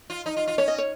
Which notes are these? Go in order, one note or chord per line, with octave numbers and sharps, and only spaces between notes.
F4
D#4
F4
F4
C#4 C#5
D#5
C#5